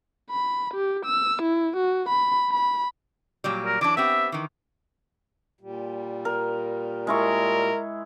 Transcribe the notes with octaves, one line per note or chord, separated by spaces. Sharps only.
B5
G4
E6
E4
F#4
B5
B5
A#2 F#3 G3
A#4
E3 F#3 D4 D6
B3 C4 G4 E5
D#3 E3
A#2 G3
A#4
G#3 E4 A#4 C#6